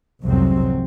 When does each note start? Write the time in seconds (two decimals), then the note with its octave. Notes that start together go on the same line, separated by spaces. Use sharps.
0.23 C2 F2 G#2 C3 F#3 C4